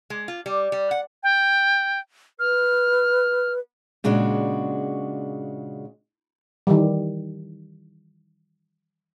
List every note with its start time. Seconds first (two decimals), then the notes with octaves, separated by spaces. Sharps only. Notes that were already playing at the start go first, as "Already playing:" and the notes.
0.10 G#3
0.28 F4
0.46 G3
0.72 G3
0.91 F#5
1.23 G5
2.39 B4 F6
4.04 A#2 C#3 G#3 D4 F#4
6.67 D#3 E3 G3